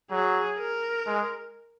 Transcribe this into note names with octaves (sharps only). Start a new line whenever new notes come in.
F#3 G#4
A#4
G#3